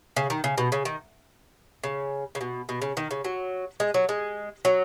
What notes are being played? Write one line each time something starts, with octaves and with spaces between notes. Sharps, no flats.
C#3
D#3
C#3
B2
C#3
D#3
C#3
C#3
B2
B2
C#3
D#3
C#3
F#3
G#3
F#3
G#3
F#3